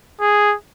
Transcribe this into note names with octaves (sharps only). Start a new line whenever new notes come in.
G#4